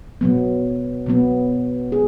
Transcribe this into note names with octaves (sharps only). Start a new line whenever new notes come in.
B2 F#3 B3
B2 F#3 B3
G#4